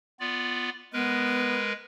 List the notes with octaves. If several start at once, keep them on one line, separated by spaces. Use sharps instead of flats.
B3 F4 D5
G#3 B3 A#4 B4